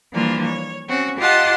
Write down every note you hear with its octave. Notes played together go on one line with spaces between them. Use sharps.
E3 F3 G3 A#3 D4 F4
C#5
C4 C#4 F#4
F4 G4 D#5 F#5 A5 C6